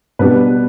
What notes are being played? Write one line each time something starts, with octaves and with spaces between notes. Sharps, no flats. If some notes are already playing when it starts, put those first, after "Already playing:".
B2 G3 B3 D4 B4